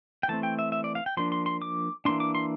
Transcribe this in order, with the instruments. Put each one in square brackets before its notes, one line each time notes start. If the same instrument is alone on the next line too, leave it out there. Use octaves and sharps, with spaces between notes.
[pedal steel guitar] G5
E3 A3 C4 A5
G5
E5
E5
D5
F5
G5
F3 A#3 D4 C6
C6
C6
D6
E3 A#3 D4 C6
D6
C6